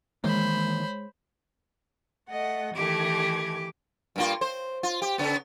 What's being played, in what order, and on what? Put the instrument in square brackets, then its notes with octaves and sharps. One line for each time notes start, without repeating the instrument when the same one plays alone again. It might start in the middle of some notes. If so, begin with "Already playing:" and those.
[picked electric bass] D#3 E3 A#3 [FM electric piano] G#3 C#5 [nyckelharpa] C5 B5
[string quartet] A3 D#5 F#5
[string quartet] D#3 A3 G#6 [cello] E3 G4
[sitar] G2 A#3 F4
C5
F4
G4
C#3 B3